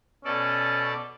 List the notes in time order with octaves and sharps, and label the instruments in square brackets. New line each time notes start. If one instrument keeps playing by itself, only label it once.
[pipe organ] B2 A4 D5 [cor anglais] C#4